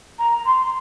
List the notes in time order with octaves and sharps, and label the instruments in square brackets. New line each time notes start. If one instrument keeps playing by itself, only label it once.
[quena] A#5
C6